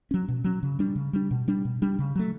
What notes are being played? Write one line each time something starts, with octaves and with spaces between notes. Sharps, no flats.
F#3 C#4
B2
F#3 C#4
C#3
G3 D4
C#3
G3 D4
B2
G3 D4
B2
G3 D4
C#3
F#3 A3